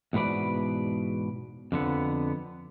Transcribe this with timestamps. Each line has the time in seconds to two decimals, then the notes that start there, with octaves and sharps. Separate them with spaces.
0.13 E2 G#2 B2 B4 D5
1.72 F2 D3 B3